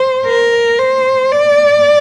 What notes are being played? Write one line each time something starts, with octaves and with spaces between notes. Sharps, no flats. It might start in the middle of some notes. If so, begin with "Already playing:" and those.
Already playing: C5
A#4
C5
D5